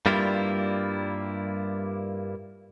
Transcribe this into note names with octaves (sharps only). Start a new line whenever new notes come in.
G2 G3 A#3 E4 F4